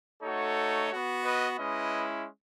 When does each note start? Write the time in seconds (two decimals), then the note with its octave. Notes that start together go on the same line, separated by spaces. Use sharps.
0.22 A3 D#4 F#4 A4 C#5
0.91 B3 F#4
1.24 B4 D#5
1.58 G#3 C#4 E4 B4 D#5